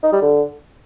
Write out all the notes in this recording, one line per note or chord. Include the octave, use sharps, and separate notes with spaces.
D#4
G3
D3